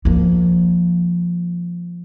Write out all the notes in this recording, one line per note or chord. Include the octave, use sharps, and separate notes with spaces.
F3 A#3